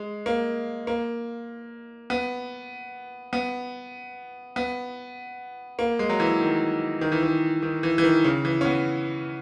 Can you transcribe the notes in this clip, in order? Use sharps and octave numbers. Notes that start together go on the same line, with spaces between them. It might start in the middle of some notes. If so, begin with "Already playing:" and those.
Already playing: G#3
A#3
A#3
B3
B3
B3
A#3
G#3
F#3
E3
D#3
D#3
E3
D#3
D#3
E3
E3
D#3
C#3
E3
C#4
B3